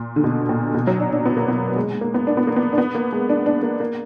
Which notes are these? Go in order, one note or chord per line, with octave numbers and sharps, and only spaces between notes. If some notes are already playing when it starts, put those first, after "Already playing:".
Already playing: A#2
D3
B2
A#2
B2
F#3
D4
D4
B3
A#3
B3
G#3
G#3
A#3
B3
D4
B3
A#3
B3
D4
B3
A#3
G#3
D4
D4
A#3
A#3